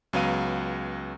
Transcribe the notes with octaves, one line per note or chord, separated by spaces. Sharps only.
C#2 F#3 B3 F5 D#7